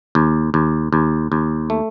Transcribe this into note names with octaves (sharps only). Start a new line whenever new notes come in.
D#2
D#2
D#2
D#2
A3